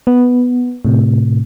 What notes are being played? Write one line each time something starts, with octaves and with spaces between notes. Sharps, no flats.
B3
A2 C3